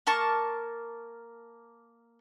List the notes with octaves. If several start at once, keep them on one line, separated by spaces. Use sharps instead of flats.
A#3 A#4 A5 C#6